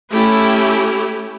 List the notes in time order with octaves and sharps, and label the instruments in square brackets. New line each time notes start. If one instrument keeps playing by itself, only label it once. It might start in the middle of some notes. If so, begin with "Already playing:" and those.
[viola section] A3 C#4 E4 G4